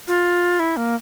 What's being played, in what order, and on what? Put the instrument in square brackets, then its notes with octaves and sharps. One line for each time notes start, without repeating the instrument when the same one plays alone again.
[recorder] F4
E4
A#3